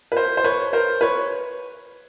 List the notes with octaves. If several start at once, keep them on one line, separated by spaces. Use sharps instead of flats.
B4
A#4 C5
C5
B4 C#5
A#4 C5
B4 C#5